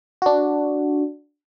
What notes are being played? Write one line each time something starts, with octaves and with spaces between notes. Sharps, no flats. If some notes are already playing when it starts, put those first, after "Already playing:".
D4 F#4